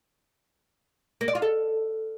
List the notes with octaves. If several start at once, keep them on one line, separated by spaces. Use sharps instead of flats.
A#3
D5
F4
A4